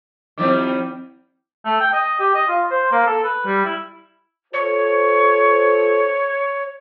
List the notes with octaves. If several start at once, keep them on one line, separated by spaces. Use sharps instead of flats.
D#3 F3 G3 C4 E4 D6
A3
G5
D#5
G4
D#5
F4
C5
A#3
A4
B4
G3
E4
F4 A4 C5 C#5